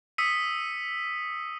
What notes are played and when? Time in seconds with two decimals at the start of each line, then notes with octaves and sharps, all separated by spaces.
0.18 D#6 E6 B6 C#7 D#7